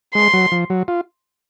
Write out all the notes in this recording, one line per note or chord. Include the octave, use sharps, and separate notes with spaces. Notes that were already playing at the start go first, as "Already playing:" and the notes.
G#3 C6
F#3
F3
F#3
F4